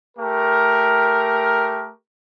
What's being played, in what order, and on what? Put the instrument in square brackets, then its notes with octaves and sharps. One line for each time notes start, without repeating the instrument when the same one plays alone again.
[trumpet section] A3 G4 A#4